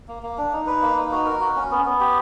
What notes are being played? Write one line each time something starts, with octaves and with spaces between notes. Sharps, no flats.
A#3
A#3
D4
D#4
B4
A#3
D#4
F#4
A#4
F#4
C#4
B3
B3
G4